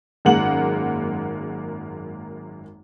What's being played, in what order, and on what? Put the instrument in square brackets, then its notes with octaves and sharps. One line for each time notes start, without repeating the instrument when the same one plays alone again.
[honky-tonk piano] G#1 F#2 G#3 A#3 F#5 F#7